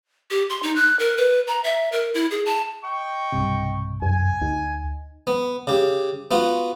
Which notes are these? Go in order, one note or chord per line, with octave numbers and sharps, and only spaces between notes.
G4
C6
D#4
F#6
A#4
B4
A#5
E5
A#4
E4
G#4
A5
D#5 G5 C#6
B1 G2 C3
F#2 G#5
D2 D#4
B3
C#3 G4
B3 F4 F#4